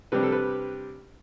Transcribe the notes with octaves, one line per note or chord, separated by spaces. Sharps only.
C3 G3 D4 B4
A4
B4